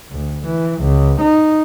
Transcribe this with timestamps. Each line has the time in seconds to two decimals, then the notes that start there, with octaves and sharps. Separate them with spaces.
0.11 D2
0.46 E3
0.81 C#2
1.20 D#4